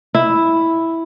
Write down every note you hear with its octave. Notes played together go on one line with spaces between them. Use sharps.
E4